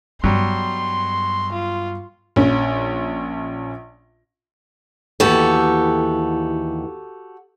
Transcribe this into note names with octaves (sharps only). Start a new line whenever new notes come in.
G2 F#3 G3 B3 C6
F4
A#1 C#4
D#2 E3 B3 F#4 G4 A4